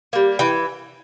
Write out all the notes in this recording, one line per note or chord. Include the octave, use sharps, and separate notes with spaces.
G3 A#3
E3 G5